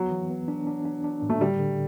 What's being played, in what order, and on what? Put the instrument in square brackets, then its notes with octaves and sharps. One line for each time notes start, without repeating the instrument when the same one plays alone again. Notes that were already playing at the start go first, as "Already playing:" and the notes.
Already playing: [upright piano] F#3 [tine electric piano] B3
[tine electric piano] E3
B3
D4
D4
D4
D4
A2
[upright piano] A3
[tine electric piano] D3 [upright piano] G3
[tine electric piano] D3